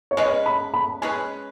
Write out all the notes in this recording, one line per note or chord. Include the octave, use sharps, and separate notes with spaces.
C#5
G#3 C#4 G#4 B4 D#5
B5
B5
G#3 C#4 G#4 B4 G#5